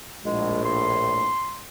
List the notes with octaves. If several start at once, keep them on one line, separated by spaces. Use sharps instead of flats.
A#1 A2 G#3
C6